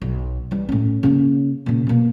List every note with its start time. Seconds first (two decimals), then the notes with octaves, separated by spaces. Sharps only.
0.02 B1
0.51 E3 G3
0.69 A2 C#4
1.03 C#3 A#3
1.66 A#2 C#3
1.87 B2 A#3